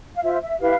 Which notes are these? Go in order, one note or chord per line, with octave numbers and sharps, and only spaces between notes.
F5
F4 C5 E5
E5
E4 G4 B4 F5